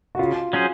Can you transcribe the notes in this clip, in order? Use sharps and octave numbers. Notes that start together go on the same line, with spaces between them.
F#4
C#3 F4
F#3 C#4 G#4 C5